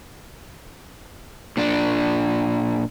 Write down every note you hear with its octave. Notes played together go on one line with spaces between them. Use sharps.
A#2 D4